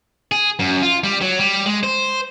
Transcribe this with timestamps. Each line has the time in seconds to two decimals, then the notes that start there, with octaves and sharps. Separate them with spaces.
0.32 G#4
0.59 F#2
0.82 F4
1.04 G3
1.21 F#3
1.39 G3
1.66 G#3
1.83 C5